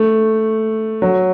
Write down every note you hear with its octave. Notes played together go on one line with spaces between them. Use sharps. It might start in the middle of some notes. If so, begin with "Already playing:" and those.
Already playing: A3
F#3